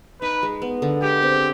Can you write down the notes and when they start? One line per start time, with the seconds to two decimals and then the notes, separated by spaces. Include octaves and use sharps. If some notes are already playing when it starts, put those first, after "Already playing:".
0.21 D#4 B4
0.43 G#3
0.62 B3
0.82 D3
1.02 G#3 G4
1.23 C4